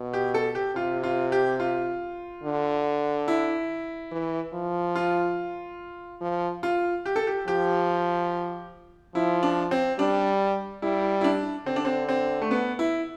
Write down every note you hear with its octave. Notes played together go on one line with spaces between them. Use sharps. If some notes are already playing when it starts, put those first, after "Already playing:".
Already playing: B2
G4
A4
G4
C3 F4
F4
G4
F4
D3
E4
E3
F3
F4
F3
F4
G4
A4
G4
F3 G4
F3 E4
D4
C4
G3 D4
G3 E4
E4
D4
D3 C4
D4
C4
C4
A3
B3
E4